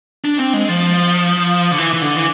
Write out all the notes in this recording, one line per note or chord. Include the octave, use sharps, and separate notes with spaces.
D4
C4
G#3
F3
D3
E3
E3
D3
E3